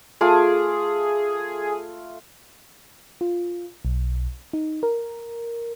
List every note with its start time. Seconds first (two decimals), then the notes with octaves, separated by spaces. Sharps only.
0.21 A3 F4 G#4 D6
3.21 F4
3.85 B1
4.53 D#4
4.83 A#4